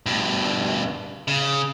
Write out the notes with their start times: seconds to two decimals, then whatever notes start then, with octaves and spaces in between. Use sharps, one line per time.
0.06 G2 B2
1.28 C#3